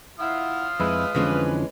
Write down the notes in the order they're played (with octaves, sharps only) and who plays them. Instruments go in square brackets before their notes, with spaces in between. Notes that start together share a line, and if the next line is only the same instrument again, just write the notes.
[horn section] E4 F#5 [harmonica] F4 D#6 F6
[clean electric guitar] F2 E4 [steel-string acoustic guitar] G#3 [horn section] B4
[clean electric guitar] F2 D3 F3 [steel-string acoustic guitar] E3 G#3 C#4